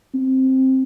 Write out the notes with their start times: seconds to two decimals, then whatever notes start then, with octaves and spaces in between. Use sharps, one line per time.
0.14 C4